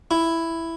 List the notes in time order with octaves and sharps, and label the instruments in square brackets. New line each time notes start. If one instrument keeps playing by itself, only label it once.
[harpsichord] E4